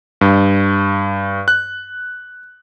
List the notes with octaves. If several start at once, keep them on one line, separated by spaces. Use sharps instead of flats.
G2
F#6